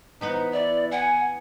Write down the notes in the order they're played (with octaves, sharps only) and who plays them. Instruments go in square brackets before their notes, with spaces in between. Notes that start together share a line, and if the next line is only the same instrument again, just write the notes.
[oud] E3 B3 B4 [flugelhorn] D#4
[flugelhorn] E4 [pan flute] D5
[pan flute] F#5 [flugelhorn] G#5